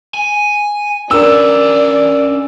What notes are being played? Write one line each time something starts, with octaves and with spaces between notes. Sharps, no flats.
G#5
C#4 D4 A#4 B4 D5 E6